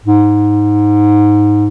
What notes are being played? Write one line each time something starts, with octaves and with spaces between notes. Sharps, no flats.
G#2